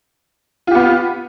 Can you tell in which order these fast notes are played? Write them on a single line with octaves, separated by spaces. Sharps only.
F4 G4 B3